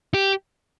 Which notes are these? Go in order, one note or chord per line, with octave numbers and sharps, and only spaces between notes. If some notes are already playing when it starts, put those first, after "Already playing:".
G4